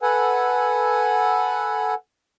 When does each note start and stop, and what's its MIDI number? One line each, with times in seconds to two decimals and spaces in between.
0.02 1.94 69
0.02 1.94 71
0.02 1.94 78
0.02 1.94 80